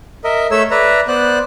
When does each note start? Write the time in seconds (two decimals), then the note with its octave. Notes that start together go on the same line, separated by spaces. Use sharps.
0.24 A#4 D#5 E5
0.51 A3 A4 C#5 E5 E6
0.71 B4 D5 E5 A#5
1.08 B3 C5 D5 F#6